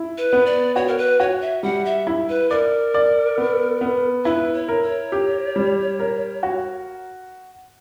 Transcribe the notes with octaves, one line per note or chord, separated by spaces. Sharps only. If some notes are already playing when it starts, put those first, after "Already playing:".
Already playing: E4
B4
B3
D5
F#4 C#5
A#4
B4
F#4 C#5
E5
G3 F#5
E5
E4
B4
A#4 D5
D5
B3
B3
E4 B4
C#5
A#4
C#5
G4
G3
A#4
F#4